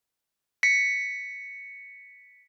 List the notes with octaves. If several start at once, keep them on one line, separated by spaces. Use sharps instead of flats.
B6 C#7